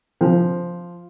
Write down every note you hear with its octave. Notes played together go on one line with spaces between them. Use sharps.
F3